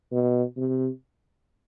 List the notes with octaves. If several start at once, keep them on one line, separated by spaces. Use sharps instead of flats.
B2
C3